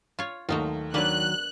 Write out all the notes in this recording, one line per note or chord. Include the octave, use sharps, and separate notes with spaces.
F4 C#5
D#2 F#3 A3 D#4 F4
D#3 F#3 A#3 D4 B4 F#6